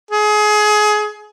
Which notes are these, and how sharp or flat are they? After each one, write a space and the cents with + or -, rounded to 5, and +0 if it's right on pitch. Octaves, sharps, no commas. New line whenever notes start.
G#4 +25